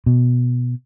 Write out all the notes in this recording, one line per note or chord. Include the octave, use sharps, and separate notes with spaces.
B2